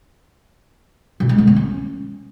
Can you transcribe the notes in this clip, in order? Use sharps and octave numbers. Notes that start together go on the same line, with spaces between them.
B2
G#3
D3
A#3
C#4